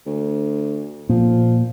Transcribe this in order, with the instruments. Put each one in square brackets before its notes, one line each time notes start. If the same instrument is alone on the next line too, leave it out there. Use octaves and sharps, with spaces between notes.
[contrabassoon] D2
[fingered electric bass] A#2 [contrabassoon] F3